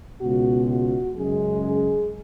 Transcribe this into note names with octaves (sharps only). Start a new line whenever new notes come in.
C#2 B2 G#3 F#4
F#4
F#2 C#3 G#3 G#4
G#4